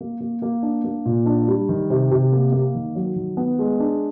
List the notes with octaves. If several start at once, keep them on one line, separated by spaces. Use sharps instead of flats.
A#3
A#3
A#3
D4
A#3
A#2
D4
G3
D#3
C3
C3
A#3
A#3
D#3
F#3
D#3
B3
G#3
D4